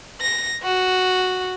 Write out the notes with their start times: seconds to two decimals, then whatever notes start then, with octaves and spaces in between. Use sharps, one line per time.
0.21 A#6
0.63 F#4